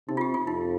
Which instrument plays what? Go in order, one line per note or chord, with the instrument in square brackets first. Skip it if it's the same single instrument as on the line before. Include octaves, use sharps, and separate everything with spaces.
[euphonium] C3 [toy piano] D#4
[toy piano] F4
G4
F4
[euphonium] F2 [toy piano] D#4